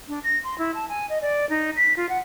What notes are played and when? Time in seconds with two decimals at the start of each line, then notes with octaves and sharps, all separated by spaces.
0.08 D4
0.24 A#6
0.44 C6
0.58 E4
0.75 A5
0.89 G#5
1.09 D#5
1.22 D5
1.50 D#4
1.77 B6
1.97 F4
2.09 F#5